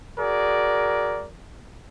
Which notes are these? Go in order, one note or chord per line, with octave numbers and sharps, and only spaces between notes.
F#4 G#4 A#4 D5